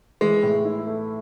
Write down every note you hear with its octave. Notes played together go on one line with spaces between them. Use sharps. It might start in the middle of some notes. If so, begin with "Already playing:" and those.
E3 G#3
A2
E4
A3